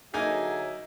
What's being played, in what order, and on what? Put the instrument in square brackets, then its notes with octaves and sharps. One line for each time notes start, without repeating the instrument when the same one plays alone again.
[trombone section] D3 F#3 [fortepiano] A#3 D#4 G#5 [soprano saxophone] G#4 [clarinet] E5